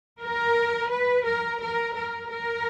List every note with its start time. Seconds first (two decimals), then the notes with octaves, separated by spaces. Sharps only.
0.22 A#4
0.91 B4
1.25 A#4
1.61 A#4
1.95 A#4
2.30 A#4